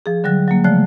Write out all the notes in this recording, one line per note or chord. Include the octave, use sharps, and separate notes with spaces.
F3 G#4
D3 F#3 G3 F#6
F#3 G3 A#3
C#3 F3 G#3 A3 D5 F#6